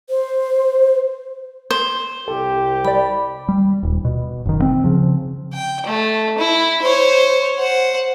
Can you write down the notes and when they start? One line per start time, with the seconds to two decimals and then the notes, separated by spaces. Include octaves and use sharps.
0.10 C5
1.71 C5
2.28 C2 G4 A4
2.85 G3 D5 B5
3.49 G3
3.83 D#1
4.05 B2
4.45 F#1 D#3
4.62 C4
4.84 C#3 F3
5.53 G5
5.86 A3
6.38 E4
6.82 C5 C#5
7.59 C5 F#5